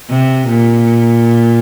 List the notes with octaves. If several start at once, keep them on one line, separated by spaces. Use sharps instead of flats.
C3
A#2